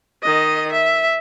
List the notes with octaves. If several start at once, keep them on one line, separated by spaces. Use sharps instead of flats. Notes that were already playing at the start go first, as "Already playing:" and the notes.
D#3 D#5
E5